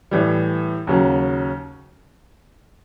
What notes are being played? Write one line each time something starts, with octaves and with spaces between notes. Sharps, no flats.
A2 E3 G3
D#2 C#3 F#3